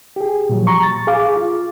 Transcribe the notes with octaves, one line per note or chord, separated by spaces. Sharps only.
G4 G#4
A#2 F3 F#3
A#5 C#6
A6
G#4 F5 D6
F4